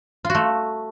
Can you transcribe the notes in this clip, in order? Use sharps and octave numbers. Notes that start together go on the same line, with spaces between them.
F4
F#4
A3